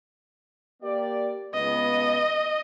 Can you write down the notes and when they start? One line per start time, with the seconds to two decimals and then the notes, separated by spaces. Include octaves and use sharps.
0.82 A#3 G4 D5
1.54 C#2 B3 D#5